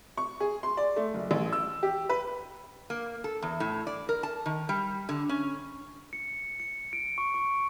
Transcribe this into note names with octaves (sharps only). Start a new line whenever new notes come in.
C#6
G#4
C6
D5
A3
F#1
A1
E6
G4
B4
A#3
A4
E2
A2
D5
A#4
A5
D#3
G3
D3
C#4
C#7
C#7
D7
C#6
C#6